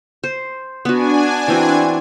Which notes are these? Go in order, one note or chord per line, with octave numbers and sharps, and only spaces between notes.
C5
B3 D4 F#4 G#5
E3 C4 F#4